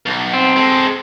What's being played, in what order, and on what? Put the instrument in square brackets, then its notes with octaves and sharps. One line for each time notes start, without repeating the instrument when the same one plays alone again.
[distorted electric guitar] B1
[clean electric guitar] C4
[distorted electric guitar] G#3 A4